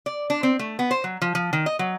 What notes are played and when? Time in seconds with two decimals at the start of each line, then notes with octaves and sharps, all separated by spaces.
0.06 D5
0.30 D4
0.43 C4
0.59 A3
0.79 B3
0.91 C5
1.04 F#3
1.22 F3
1.35 F3
1.53 D#3
1.66 D#5
1.79 F#3